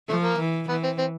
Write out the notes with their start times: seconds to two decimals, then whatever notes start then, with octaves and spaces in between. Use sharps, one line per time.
0.09 F3 A3
0.24 A#3
0.39 E3
0.69 E3 B3
0.84 C4
0.98 C4